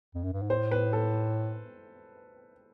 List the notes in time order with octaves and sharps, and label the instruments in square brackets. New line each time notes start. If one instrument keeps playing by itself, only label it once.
[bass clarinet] F2
F#2
G2
G#2
[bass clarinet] A2 [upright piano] C5
[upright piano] B4
A4